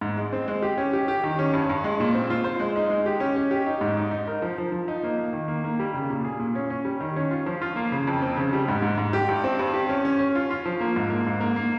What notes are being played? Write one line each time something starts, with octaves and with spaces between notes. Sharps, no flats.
G#2
G#3
C4
G#3
G4
C#4
G4
G4
D#3
C#4
G2
G2
G#3
A#2
C4
F4
C5
G#3
D#4
G#3
G4
C#4
C#4
G4
D#4
G#2
D#4
D#4
A#4
F3
F3
F3
D#4
A#3
A#3
D#3
A#3
A#3
G3
C#3
A#2
G#4
A#2
C#4
C#4
G3
D#3
C#4
F4
F3
F4
A#3
C#3
F2
C4
C#3
G3
G#2
G#2
G#2
G4
G2
C4
G2
G4
C#4
C#4
C#4
F4
F4
F3
A#3
G#2
A#3
G#2
A#3
A#3